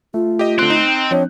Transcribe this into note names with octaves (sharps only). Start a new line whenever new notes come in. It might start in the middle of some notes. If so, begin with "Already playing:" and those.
A3 F4
G4 D#5
D3 C4 F#6
D#4
F3 C4 D4 C#5